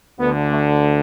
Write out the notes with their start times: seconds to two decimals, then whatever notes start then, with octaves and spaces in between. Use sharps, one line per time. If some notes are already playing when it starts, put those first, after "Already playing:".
0.19 D2 B3
0.24 D3
0.50 A3